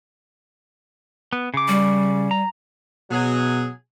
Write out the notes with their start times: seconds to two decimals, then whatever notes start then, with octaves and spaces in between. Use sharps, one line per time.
1.33 B3
1.54 C#3 D6
1.68 G3
2.31 A#5
3.11 B2 F#3 G#4